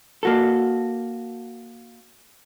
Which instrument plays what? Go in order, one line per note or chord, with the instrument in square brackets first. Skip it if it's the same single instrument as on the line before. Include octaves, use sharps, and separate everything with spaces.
[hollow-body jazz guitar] A#3 F#4 A4